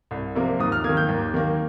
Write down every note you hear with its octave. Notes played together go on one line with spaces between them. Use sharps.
C2
C3 F3 A#3
D#2 D#6
F6
A#3 G#6
D#3
G6
D#2
D#3 A#3